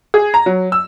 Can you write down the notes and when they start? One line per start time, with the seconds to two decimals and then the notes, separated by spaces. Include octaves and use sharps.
0.14 G#4
0.34 A#5
0.46 F#3
0.72 E6